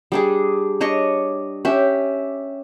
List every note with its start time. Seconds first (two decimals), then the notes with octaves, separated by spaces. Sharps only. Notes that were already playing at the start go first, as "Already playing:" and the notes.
0.12 G3 D4 G#4
0.81 D4 C#5 D#5 C#6
1.65 C#4 G4 E5